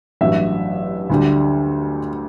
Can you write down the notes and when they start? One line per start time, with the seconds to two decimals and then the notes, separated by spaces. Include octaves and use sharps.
0.21 A1 G2 F#3 E5
1.10 D2 D3 G3